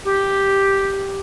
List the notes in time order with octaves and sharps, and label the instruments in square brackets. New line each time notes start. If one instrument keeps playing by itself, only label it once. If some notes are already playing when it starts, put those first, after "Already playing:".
[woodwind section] G4